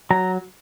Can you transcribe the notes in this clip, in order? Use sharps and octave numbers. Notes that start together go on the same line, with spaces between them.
F#3 A#5